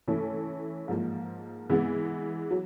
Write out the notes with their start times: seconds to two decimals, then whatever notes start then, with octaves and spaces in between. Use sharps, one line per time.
0.08 E3 A3 C#4 E4 A4
0.88 G#2 F3 A#3
1.70 E3 G#3 B3
2.51 F#3